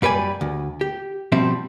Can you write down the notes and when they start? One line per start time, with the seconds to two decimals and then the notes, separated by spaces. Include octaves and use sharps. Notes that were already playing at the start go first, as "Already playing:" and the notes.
0.02 F#2 G3 B4 D5 G#5
0.41 D2
0.81 G4
1.32 B2 F3 G3 C4 E5